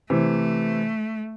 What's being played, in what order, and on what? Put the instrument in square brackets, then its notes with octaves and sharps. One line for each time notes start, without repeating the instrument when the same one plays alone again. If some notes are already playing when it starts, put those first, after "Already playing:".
[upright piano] C3 E3 [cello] A3